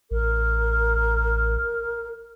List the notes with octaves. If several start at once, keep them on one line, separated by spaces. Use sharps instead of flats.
A1 A#4